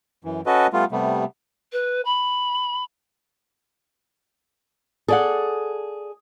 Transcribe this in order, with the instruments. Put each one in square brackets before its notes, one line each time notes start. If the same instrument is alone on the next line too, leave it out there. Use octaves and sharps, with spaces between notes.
[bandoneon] F#2 E3
C#4 F#4 A4 B4 D#5
G3 A3 B3 F4
C3 G3 A3 B3
[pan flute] B4
B5
[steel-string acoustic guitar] G#4 [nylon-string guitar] A4 D5 F#5